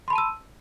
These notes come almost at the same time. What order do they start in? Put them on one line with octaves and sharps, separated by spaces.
C6 B5 A5 D#7 E6